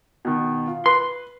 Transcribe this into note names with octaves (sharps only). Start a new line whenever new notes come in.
B2 D#3
F4
B4 C6